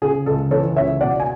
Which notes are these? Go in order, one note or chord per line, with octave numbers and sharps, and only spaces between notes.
C#3 G#4
C#2 A4
E3 A4 C#5
C#2 C#5 E5
B2 D5 F#5
G#5